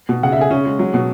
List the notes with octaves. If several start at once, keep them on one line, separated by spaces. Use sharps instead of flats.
B2
C#3 F#5
E5
C#3 G#4
C#3 C#4
G#3
F#3
B2